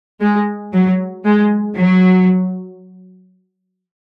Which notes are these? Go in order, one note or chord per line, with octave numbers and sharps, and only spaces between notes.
G#3
F#3
G#3
F#3